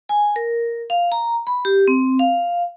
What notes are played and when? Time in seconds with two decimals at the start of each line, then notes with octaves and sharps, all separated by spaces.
0.09 G#5
0.36 A#4
0.90 F5
1.12 A#5
1.47 B5
1.65 G4
1.88 C4
2.19 F5